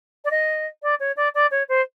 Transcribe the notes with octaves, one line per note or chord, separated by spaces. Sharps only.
D5
D#5
D5
C#5
D5
D5
C#5
C5